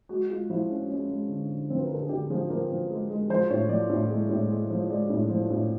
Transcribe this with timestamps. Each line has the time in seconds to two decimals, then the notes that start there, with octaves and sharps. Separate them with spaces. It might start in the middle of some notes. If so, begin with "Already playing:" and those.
0.09 G#3 F#4
0.29 G#3 F4
0.50 F3 E4
0.70 G#3 C#4
0.89 G#3 C#4
1.10 G#3
1.29 D3
1.49 D3
1.70 F3 C4
1.78 B4
1.87 A#4
1.90 D3
1.95 A4
2.02 G#4
2.09 D3 G4
2.30 F3 G#4
2.50 F3 A#4
2.69 F3
2.90 G#3
3.09 G#3
3.30 F3 C5
3.50 A2 C#5
3.69 F3 D5
3.90 A2
4.09 G#3
4.29 A2
4.49 G#3
4.70 F3
4.90 G#3 D5
5.10 A2
5.30 F3
5.50 A2